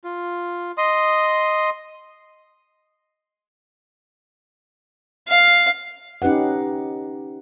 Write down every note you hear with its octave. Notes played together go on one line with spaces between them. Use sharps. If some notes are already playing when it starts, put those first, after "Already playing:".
F4
D#5 C6 D#6
F5
C#4 D#4 G4 B4 F#5